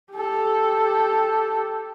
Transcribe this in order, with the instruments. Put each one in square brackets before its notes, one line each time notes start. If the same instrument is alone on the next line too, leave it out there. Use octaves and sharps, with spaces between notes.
[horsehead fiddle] G4 A4